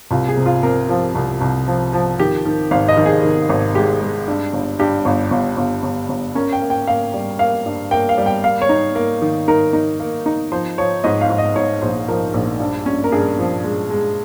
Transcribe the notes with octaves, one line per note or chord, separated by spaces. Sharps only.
C2 F4
G#4
C3
F4
C3 A#4
F3
C2
C2
F3
F3
D#3 G4
D#3
G#1 F5
D#5
D#3
G#4
D#3
G#1
G#3 G4
G#3
G2
G1
G2 G4
G1
G1
G1
G1
G1
C#4 A#4
G5
A#3
G5
A#3 F5
G3
A#3 F5
G2
A#3 G5
F5
G3
G5
A#3 F5
C#5
D#4
A#3
D#3
D#4 A#4
D#4
A#3
D#4
F3 C5
F3 C#5
G#2 D#5
F5
G#2
D#5
G#2 C#5
A#1 C5
F3 A#4
A#1
G2
C#4
A#4
G2 G#4
F3
G#3
G#3